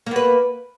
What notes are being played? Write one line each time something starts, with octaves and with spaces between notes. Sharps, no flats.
A#3 B3 B4